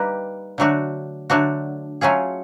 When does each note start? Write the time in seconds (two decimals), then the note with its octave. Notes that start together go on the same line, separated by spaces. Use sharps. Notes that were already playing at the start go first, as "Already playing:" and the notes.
Already playing: G3 A#3 D#4 G4 B4
0.58 D3 F#3 A3 D4 F#4
1.30 D3 F#3 A3 D4 F#4
2.01 F#3 A3 C#4 F4 G#4